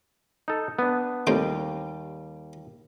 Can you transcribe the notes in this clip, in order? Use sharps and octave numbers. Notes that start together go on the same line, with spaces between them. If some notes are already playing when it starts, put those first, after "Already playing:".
D#4 A4
B3 D4
D#2 A2 C3 G3 G5